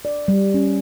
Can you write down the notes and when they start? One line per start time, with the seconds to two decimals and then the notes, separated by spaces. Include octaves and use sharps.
0.05 D5
0.28 G3
0.54 C#4